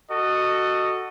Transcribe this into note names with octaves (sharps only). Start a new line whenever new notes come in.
F#4 A4 D#5